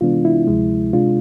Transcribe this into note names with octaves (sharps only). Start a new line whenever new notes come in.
C3 E3 G#3 B3 D4 F4
E4
D2 C3 F3 G#3
C3 G#3 D4 F4